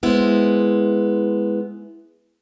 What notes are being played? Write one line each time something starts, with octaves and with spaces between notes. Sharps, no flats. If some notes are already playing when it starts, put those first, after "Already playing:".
G#3 B3 E4 C5